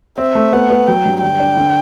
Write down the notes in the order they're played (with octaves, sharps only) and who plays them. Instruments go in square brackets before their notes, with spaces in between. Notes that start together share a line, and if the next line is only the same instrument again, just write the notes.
[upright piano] C4 [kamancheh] E5
[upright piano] A3
[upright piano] B3 [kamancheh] F#5
[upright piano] B3
[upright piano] F#3 [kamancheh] G5
[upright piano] G2
[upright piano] D3 [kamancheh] G5
[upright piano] D4
D3